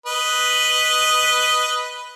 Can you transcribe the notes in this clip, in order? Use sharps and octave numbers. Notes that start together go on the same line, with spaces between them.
B4 D#5